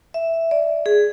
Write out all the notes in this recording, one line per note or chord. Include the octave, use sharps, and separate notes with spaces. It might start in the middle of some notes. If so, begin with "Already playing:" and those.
E5
D5
G#4